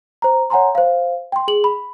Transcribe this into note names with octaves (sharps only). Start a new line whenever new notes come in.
C5 A#5
C#5 F#5 G#5 A#5 C6
C5 F5
G5 C6
G#4 F#7
B5